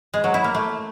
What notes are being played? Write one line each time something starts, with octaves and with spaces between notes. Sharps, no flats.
G#3
F#3
E4
A#3
A3